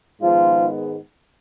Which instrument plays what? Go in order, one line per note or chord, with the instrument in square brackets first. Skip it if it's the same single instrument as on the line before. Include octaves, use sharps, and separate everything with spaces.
[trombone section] G#2 D#3 F3 G#3 B3 F4